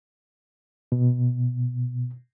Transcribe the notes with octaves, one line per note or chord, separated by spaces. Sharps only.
B2